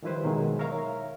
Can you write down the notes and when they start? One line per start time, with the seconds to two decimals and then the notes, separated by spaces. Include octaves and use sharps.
0.03 D#3 F3 G3 E4 B4 C5
0.24 B2 D#3 F#3 G#3
0.59 A#4 C#5 E5 F5 A#5